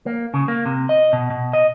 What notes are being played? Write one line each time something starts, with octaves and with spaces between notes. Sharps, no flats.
A#3
C#3
A#3
C3
D#5
B2
B2
D#5